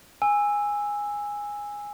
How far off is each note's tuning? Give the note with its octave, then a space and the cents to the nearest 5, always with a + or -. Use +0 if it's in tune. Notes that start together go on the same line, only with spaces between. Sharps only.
G#5 -10 E6 +0